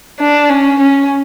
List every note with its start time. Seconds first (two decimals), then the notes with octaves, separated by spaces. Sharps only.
0.20 D4
0.50 C#4
0.80 C#4